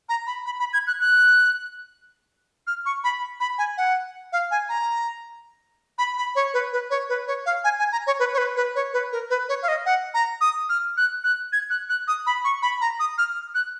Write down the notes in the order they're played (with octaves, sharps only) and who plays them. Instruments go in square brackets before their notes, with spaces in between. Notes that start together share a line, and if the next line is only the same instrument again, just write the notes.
[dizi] A#5
B5
B5
B5
G#6
F#6
F#6
F6
C#6
B5
B5
G#5
F#5
F5
G#5
A#5
B5
B5
C#5
B4
B4
C#5
B4
C#5
F5
G#5
G#5
A#5
C#5
B4
C#5
B4
B4
C#5
B4
A#4
B4
C#5
F5
D#5
F#5
A#5
D#6
F6
F#6
F#6
G#6
F#6
F#6
D#6
B5
C#6
B5
A#5
D#6
F6
F#6